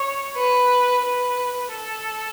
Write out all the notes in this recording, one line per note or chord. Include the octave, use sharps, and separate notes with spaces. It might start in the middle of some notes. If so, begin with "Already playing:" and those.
Already playing: C#5
B4
B4
A4